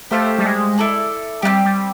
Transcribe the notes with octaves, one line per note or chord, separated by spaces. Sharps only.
A3 G4 C5 F5
G3
G#3
E4 A4 D5
G3 C4 D#4 G4
G3